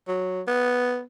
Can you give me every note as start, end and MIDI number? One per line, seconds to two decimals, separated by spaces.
0.08 0.41 54
0.47 1.02 59